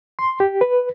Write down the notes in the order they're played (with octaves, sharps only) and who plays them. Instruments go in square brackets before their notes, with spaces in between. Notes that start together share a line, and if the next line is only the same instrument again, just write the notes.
[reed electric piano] C6
G4
B4